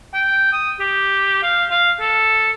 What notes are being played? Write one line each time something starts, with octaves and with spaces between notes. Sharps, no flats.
G5
D#6
G4
F5
F5
A4